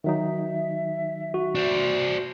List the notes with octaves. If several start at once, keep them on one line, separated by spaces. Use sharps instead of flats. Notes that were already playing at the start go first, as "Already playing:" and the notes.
D#3 F#3 D#4 E5
F#4
D4 C5